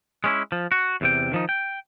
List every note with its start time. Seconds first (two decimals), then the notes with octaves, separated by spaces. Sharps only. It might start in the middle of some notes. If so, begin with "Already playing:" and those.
0.24 G#3 C#4 E4
0.52 F3
0.72 F#4
1.01 E2 C3 G5
1.32 D#3 F3 D#4
1.49 G5